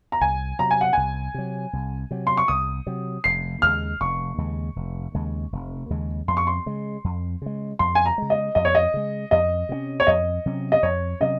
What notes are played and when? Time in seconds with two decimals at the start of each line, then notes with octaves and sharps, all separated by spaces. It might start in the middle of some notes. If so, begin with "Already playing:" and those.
0.12 A#5
0.21 C2 G#5
0.59 C3 F#3 A#5
0.71 G#5
0.81 F#5
0.93 C2 G#5
1.34 C3 F#3
1.73 C2
2.11 C3 F#3
2.27 C6
2.37 C#6
2.48 C2 D#6
2.87 C3 F#3
3.24 F1 C7
3.62 D#2 C#3 G#3 F6
4.01 F1 C#6
4.38 D#2 C#3 G#3
4.76 F1
5.15 D#2 C#3 G#3
5.53 F1
5.90 D#2 C#3 G#3
6.28 F2 C6
6.37 C#6
6.47 C6
6.66 C#3 G#3
7.04 F2
7.42 C#3 G#3
7.79 F2 C6
7.95 G#5
8.06 A#5
8.18 C#3 G#3
8.30 D#5
8.55 F2 D#5
8.65 C#5
8.75 D#5
8.94 C#3 G#3
9.31 F2 D#5
9.69 C3 F#3 C#4
10.00 C#5
10.07 F2 D#5
10.46 C3 F#3 C#4
10.72 D#5
10.83 F2 C#5
11.21 C3 F#3 C#4 D#5